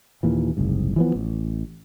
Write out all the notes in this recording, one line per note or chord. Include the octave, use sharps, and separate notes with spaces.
D#2 A#2 E3
F#1 C2 G#2
E3 F3 B3
A1